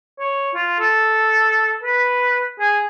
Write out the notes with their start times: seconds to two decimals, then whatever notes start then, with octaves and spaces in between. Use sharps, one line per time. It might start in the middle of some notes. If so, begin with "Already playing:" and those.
0.19 C#5
0.54 F4
0.79 A4
1.83 B4
2.60 G#4